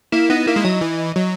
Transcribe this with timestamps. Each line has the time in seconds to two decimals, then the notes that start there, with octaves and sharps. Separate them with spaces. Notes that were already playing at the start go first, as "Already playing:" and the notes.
0.12 A#3 E4
0.30 B3 D#4
0.47 A#3 E4
0.56 G#3
0.65 F#3 D#5
0.81 E3
1.16 F#3